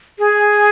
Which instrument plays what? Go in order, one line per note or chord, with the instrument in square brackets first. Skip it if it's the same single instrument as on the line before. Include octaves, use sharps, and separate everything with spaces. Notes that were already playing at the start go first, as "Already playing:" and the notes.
[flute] G#4